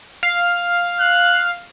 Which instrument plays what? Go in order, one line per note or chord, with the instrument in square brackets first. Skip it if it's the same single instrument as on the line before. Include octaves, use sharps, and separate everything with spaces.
[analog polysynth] F5
[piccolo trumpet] F#6